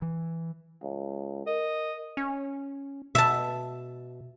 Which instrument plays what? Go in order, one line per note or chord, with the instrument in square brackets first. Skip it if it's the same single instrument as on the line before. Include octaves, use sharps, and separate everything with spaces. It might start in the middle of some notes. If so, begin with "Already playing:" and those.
[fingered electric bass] E3
[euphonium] C#2
[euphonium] A#4 [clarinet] D#5
[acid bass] C#4
[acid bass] B2 [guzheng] E5 A5